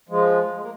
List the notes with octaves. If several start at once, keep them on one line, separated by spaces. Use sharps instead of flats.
F3 G#3
G#3
A#3